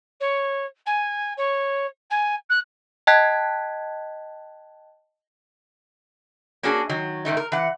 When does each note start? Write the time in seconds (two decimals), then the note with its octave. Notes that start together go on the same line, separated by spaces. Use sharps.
0.20 C#5
0.86 G#5
1.37 C#5
2.10 G#5
2.49 F#6
3.07 D#5 G5 A5 F#6 G#6 B6
6.63 A#3 C#4 D4 F#4 G#4
6.89 D#3 F#3
7.25 G#2 D#3 A3 D#4
7.37 A#4
7.52 E3 F#5